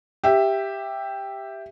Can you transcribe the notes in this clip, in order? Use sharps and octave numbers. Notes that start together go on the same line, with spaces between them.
G4 E5